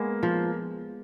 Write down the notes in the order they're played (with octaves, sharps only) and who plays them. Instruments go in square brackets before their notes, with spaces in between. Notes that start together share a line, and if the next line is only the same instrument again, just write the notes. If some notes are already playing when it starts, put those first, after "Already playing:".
Already playing: [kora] G#3 B3 [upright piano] A#3
[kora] F3